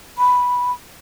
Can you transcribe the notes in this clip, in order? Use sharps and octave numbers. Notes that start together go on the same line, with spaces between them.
B5